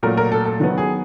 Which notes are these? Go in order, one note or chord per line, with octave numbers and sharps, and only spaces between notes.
A#2 F#3 A3 A#4
A#4
A4
A4
D#3 F#3 B3
G#4